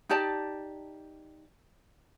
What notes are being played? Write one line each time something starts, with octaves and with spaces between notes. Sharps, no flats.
D#4 G4 D5 A5